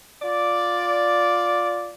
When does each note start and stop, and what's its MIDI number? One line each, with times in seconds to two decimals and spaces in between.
0.22 1.94 65
0.22 1.94 74